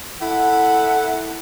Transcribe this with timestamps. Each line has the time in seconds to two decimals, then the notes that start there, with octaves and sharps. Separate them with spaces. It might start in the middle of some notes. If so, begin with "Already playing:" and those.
0.22 E4 A4 F#5